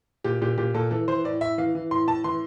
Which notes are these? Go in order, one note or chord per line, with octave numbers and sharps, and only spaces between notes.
A#2 G4
A#2 G4
A#2 G4
A#2 A4
E3 A4
E3 C5
A2 D5
A2 E5
E3 F5
E3
A2 C6
A2 A5
E3 C6